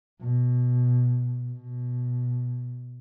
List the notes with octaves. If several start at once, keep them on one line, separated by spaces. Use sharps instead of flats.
B2
B2